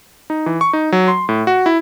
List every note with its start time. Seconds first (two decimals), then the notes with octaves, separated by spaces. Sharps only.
0.30 D#4
0.46 E3
0.61 C#6
0.73 D#4
0.92 F#3
1.08 C6
1.29 A2
1.47 F#4
1.66 E4